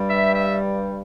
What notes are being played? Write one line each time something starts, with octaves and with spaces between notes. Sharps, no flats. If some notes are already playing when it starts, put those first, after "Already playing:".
Already playing: G2 G3
E5
E5